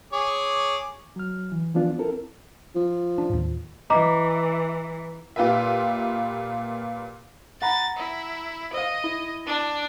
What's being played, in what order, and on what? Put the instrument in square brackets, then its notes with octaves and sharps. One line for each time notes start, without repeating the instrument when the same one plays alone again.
[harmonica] G#4 C#5 D6
[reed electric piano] F#3 F6
E3
E3 F3 B3 D4 F4
C4 E4 A4 A#4
[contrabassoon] F3
[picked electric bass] D4
D#2 A2
[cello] E3 [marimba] D#5 [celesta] A#5 D6
[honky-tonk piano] A#2 F4 G4 B4 E5
[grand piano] F#5 A#5 B5 [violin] A6
[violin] E4
[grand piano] C5 F5 [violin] D#5
[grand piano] E4
[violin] D4